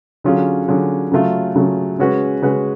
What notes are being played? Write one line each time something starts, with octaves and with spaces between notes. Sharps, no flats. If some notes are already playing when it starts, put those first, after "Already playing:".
D3 F#3 C#4 F4 G#4
D3 F#3 C#4 F4 G#4
C#3 F#3 A3 F4
C#3 F#3 A3 F4
C#3 G#3 C#4 F#4 B4
C#3 G#3 C#4 F#4 B4